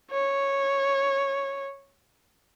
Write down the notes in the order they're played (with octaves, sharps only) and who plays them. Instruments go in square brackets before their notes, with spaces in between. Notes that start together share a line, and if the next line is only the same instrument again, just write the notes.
[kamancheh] C#5